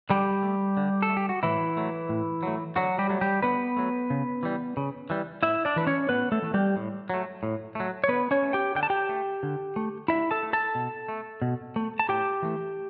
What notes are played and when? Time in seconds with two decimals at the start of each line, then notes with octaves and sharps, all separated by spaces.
0.10 D3 G3 G4
0.43 A3
0.77 D3
1.02 A4
1.09 A3
1.17 G4
1.29 F#4
1.43 A2 E3 E4
1.77 F#3 A3
2.09 A2
2.43 F#3 A3
2.76 D3 F#3 F#4
2.99 G3 G4
3.09 F#3 A3
3.21 G3 G4
3.42 D3 B3 B4
3.77 F#3 A3
4.10 C#3
4.43 E3 G3
4.77 C#3
5.10 E3 G3
5.43 A2 E4 E5
5.65 D4 D5
5.76 E3 A3 B4
5.87 C#4 C#5
6.09 A2 B3 B4
6.32 A3 A4
6.42 E3 A3
6.54 G3 G4
6.76 A2
7.10 F#3 A3
7.43 A2
7.75 F#3 A3
8.04 C#5
8.09 D3 B3 B4
8.31 C#4 C#5
8.43 A3
8.53 G4 G5
8.75 D3 G5
8.83 A5
8.90 G4 G5
9.09 A3
9.43 D3
9.76 A3
10.08 D3 E4 E5
10.31 A4 A5
10.43 A3
10.53 A4 A5
10.75 B2
11.08 A3
11.42 B2
11.76 A3
11.99 A5
12.08 A2 G4 G5
12.42 E3 A3